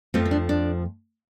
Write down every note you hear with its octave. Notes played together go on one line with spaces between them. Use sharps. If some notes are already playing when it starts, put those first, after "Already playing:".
F2 F3 A3 C4
C4
D4
D4